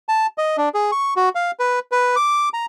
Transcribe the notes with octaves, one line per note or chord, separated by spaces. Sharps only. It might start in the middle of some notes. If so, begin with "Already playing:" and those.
A5
D#5
D4
G#4
C#6
F#4
F5
B4
B4
D6
A#5